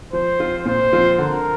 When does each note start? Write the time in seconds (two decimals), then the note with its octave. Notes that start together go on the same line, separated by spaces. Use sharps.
0.13 F3 C5
0.39 C4 F4
0.65 A#2 C5
0.93 F3 C4 F4
1.18 D3 A#4